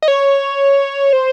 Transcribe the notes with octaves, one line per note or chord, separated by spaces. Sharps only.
D#5
C#5
C5